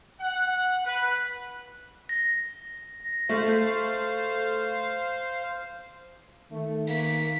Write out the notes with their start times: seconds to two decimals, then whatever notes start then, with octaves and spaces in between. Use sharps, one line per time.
0.20 F#5
0.85 B4
2.09 A#6
3.29 A3 C5 F5
6.51 D#3 A3
6.88 A#3 B6